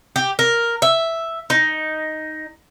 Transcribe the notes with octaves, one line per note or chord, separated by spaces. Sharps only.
G4
A#4
E5
D#4